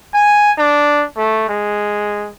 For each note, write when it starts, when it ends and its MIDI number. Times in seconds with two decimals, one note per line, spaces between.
0.14 0.51 80
0.58 1.05 62
1.17 1.45 57
1.49 2.29 56